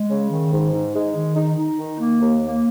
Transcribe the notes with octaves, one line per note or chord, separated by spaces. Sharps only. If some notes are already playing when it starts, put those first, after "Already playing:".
Already playing: G#3
C#3
D#3
G#2
D#4
G#3
D#3
D#4
D#4
D#3
A#3
D#2
A#3